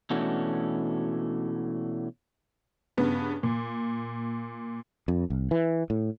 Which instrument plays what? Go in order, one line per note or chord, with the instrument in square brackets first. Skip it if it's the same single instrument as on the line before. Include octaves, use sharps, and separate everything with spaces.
[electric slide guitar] B2 E3 A3 C#4 D4 F#4
[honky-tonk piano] G2 C#3 B3
A#2
[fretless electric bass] F2
C2
E3
A2